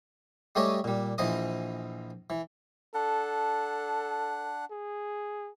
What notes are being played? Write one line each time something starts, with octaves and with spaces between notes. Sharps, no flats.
G3 A3 G4 G#4 C#5 D#5
A#2 G3
A#1 E3 F3 D#5 D#6
E3
D4 A4 F#5
G#4